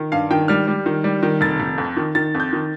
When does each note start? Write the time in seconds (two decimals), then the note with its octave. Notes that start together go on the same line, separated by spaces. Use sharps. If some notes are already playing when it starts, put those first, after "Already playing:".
Already playing: D#3
0.12 G2 F5
0.30 D#3 G5
0.48 G3 F6
0.67 G3
0.86 D#3
1.04 G3
1.23 D#3
1.41 F1 A6
1.60 F1
1.78 F2
1.97 D#3
2.15 D#3 A6
2.35 F2
2.40 G6
2.53 D#3